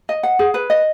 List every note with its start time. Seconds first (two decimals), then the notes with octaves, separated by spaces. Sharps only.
0.09 D#5
0.23 F#5
0.39 G#4
0.54 B4
0.70 D#5